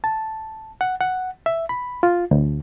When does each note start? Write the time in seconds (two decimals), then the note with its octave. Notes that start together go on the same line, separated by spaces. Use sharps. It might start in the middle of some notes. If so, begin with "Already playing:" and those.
0.04 A5
0.81 F#5
1.01 F#5
1.46 E5
1.69 B5
2.03 F4
2.31 D2